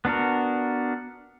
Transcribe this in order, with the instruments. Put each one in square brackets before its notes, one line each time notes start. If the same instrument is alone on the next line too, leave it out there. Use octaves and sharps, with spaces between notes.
[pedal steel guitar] B3 D4 F#4 A#4